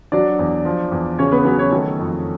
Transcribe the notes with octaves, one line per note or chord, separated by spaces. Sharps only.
F#3 D4 D5
E2
F3
E2
C#3 C#4 C#5
B3 B4
F#3 B3 B4
C#4 C#5
D#3 A3 A4
F2